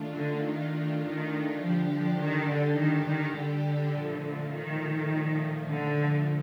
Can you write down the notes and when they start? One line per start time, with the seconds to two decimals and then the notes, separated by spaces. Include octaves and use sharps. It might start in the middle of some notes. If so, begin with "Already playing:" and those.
Already playing: D#3 A3 D4 F4
0.15 D3
0.45 D#3
1.03 D#3
1.61 D3 F3 G3 D4 G4
1.90 F3
2.19 D#3
2.47 D3
2.76 D#3
3.06 D#3
3.34 D3
3.92 A#2 F3 A3
4.52 D#3
5.68 D3